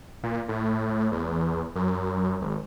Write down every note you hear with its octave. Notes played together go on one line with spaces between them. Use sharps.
A#2
A2
E2
F#2
G#1